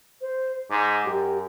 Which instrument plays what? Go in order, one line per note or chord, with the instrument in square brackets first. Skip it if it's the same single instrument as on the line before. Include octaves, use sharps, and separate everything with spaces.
[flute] C5
[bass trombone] G#2 [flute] D6
[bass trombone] F#2 [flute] G4